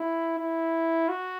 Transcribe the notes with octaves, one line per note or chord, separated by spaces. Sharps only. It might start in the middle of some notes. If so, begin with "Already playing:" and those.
Already playing: E4
E4
F#4